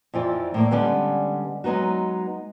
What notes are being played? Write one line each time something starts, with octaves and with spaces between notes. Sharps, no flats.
F2 E3 F4 D5
A2 A#3 D5
D3 G3 G#3 B3 C#4
F#3 G#3 B3 D#4 F#4